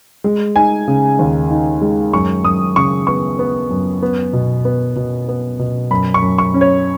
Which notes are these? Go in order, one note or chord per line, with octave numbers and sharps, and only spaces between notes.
G#3
D#4 G#5
C#3
D#2
D#4
G#3
F#2 C#6
F#2 D#6
C#3 C#6
B3 C#6
B3
F#2
B3
B2
B3
B2
B3
B2
F#2 B5
C#6
F#2
C#6
C#4
C#5